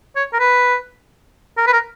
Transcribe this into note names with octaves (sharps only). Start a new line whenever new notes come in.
C#5
A#4
B4
A#4
B4
A#4